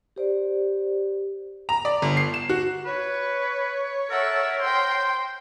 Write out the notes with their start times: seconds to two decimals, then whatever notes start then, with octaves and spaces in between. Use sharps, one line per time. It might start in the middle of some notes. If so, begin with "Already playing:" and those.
0.16 G4 C5 D5
1.69 A#5
1.85 D5
2.02 G1
2.17 C7
2.34 E7
2.49 F#4
2.86 B4 C#5
4.11 A4 A#4 E5 F#5
4.60 C5 G5 C6